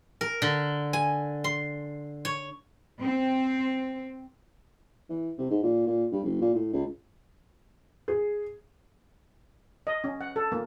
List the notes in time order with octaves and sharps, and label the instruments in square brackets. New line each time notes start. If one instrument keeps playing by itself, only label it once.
[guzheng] A#4
D3
G#5
C6
C#5
[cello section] C4
[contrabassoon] E3
C3
G#2
A#2
A#2
G2
F#1
A#2
A2
C#2
[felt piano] G#4
[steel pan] D#5
C#4
F#5
A4
A#3